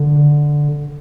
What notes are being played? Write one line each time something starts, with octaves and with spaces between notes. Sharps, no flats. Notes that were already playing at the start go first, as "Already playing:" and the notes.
Already playing: D3